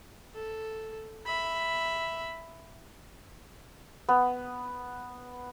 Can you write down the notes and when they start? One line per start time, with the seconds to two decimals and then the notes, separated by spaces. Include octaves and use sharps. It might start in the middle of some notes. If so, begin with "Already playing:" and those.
0.34 A4
1.26 E5 B5
4.09 B3